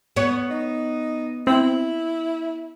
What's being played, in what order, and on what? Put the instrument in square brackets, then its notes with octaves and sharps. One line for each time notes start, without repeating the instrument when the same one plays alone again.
[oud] B3 C#5
[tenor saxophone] D#4
[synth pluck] C4 [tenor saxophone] E4